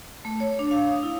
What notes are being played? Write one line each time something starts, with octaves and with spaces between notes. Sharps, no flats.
A3
C#5
D4
F5
D#6
E4